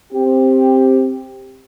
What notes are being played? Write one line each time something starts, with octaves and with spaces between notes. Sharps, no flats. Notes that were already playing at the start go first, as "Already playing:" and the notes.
C4 G4